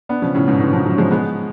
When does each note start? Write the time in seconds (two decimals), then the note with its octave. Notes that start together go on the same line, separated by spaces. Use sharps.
0.09 B3 D4
0.22 C#3 F3
0.34 A2 C#3
0.48 G#2 B2
0.60 B2 D3
0.73 C#3 F3
0.86 D3 F#3
0.98 F3 G#3
1.11 G#3 B3